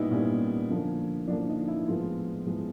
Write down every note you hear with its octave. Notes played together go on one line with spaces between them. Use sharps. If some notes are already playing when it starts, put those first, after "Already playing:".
Already playing: A#2 G3 B3 D#4 E4
A#2 G3 B3 C#4
D3 F3 A#3
D3 F3 A#3 D4
D#4
E4
A2 F3 G#3 B3 F4
A2 F3 G#3 B3